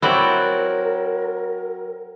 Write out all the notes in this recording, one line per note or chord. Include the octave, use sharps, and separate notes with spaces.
F#3 C4 E4 F#4 A#4 D5